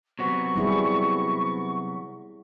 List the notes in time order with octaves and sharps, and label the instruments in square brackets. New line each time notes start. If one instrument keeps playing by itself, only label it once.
[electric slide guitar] C3 F#3 B3 [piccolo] C#6
[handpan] G3 E4 G#4